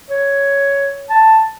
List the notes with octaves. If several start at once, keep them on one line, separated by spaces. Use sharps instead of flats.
C#5
A5